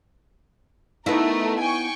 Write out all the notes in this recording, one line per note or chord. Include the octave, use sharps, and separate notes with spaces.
A3 B3 D#4 E4 A#4
G5 G#5 C#6